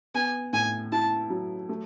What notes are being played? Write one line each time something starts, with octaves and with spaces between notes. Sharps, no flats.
B3 G#5
A2 G#5
E4 A5
F#3
A3